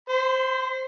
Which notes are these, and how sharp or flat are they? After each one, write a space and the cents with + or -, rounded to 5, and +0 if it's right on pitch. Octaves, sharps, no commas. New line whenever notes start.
C5 +0 C6 -45